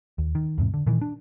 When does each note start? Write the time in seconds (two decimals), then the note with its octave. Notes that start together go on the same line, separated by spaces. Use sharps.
0.18 D#2
0.35 D#3
0.58 E2 G#2 C3
0.74 D3
0.86 A#2 D#3 E3
1.01 D4